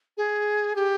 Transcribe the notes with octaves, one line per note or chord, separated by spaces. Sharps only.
G#4
G4